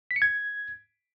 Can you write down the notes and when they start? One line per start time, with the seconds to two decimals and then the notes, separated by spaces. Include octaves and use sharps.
0.11 B6
0.16 C#7
0.22 G#6